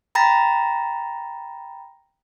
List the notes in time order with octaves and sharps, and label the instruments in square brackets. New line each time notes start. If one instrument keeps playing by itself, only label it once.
[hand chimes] G5 A#5 B5 A6 A#6